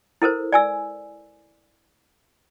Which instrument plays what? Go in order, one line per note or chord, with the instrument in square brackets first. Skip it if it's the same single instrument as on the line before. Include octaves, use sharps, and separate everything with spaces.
[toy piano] E4 A4 A#4 C5
D5 G#5 E6